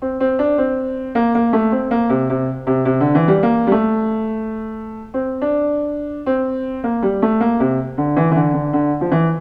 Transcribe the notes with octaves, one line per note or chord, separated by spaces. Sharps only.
C4
C4
D4
C4
A#3
A#3
A3
C4
A#3
C3
C3
C3
C3
D3
E3
G3
A#3
G3
A3
C4
D4
C4
A#3
G3
A3
A#3
C3
D3
E3
E3
D3
D3
D3
F3
E3